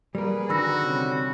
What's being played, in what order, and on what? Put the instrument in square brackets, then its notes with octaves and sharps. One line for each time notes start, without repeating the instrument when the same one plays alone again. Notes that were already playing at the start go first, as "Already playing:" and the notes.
[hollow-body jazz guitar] G3 A#3 A#4 [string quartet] G#4 B4
[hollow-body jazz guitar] D3 D#3 [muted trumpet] F#4 [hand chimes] B5 E6 A#6
[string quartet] C3 G3 C#4